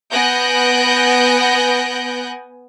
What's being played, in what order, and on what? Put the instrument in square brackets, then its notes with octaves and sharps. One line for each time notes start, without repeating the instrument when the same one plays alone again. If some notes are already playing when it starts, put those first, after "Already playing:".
[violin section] B3 G#5 F#6 G6 A#6 D7